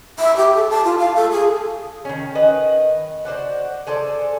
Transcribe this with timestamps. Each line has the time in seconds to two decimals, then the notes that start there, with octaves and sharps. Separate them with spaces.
0.19 E5
0.37 G4
0.55 A4
0.70 A5
0.84 F4
0.99 F5
1.15 A4
1.31 G#4
2.05 D#3 C#4
2.35 D#3 B4 D#5
3.25 F#4 C5 D5 F#5
3.87 G#4 A4 C5 D5